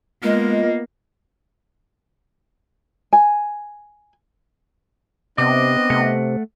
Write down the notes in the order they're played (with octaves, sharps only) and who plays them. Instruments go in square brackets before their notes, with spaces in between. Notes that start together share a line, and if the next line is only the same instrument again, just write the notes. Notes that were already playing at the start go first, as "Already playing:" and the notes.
[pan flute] G#3 [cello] A#3 B3 [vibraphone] F4 D#5
[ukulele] G#5
[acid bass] C3 [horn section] B3 C4 D4 [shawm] D#5 [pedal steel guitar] D6
[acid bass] C3 [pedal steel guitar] A3 F#5